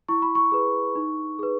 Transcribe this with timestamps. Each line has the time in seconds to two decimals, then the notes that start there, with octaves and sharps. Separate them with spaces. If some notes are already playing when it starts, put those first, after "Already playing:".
0.09 E4 C#6
0.22 B5
0.35 C#6
0.52 G#4 B4
0.96 D#4
1.39 G#4 B4